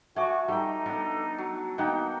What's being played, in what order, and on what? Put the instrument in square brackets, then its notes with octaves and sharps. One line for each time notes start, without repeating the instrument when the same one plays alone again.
[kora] A3 [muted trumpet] F#4 [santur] G#5 D6
[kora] G3 G5 [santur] A3 [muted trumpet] D#4
[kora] B3 [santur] D4 A4
[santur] F#3
[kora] D#3 A#3 B3 [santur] D#4 F#5 G5